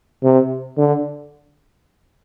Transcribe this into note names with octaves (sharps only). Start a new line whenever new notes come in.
C3
D3